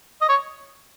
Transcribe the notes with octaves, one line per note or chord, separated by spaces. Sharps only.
D#5
C#5